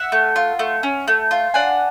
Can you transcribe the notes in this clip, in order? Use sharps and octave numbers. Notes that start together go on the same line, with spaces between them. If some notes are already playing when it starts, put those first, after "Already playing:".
Already playing: E5 F#5
A3
F4
A3
C#4
A3
F4
D4 F#5 G#5